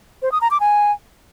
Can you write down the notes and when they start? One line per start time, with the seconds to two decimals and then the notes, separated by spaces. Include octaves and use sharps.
0.22 C5
0.32 D#6
0.41 A#5
0.51 D6
0.60 G#5